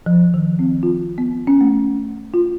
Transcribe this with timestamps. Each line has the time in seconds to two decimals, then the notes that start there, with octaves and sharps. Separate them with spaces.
0.06 F3
0.34 D#3
0.59 C4
0.83 F4
1.18 B3
1.47 C#4
1.61 A3
2.34 F4